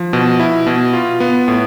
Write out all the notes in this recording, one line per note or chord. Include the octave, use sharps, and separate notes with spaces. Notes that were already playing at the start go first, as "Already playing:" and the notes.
Already playing: F3
B2
E4
B2
F4
B3
A2